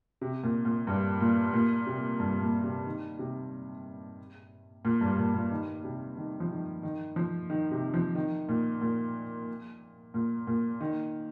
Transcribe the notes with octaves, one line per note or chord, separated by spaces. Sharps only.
C3
A#2
A#2
G2
A#2
A#2
C3
G2
A#2
C3
D#3
C3
A#2
G2
A#2
A#2
D#3
C3
D#3
F3
D#3
D#3
F3
D#3
C3
F3
D#3
A#2
A#2
A#2
A#2
D#3